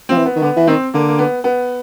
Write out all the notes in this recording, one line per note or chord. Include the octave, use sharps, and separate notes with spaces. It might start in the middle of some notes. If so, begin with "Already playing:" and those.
F3 C4
E3
B3
D#3
D3 B3
E3
D#3 C4
D3 A#3
A#3
B3
B3